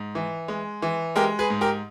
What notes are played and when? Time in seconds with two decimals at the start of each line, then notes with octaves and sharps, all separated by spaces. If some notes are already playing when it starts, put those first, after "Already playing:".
Already playing: G#2
0.15 E3
0.48 G#3
0.82 E3
1.16 G#3 G4 A#4
1.39 G#4 B4
1.50 G#2
1.61 G4 A#4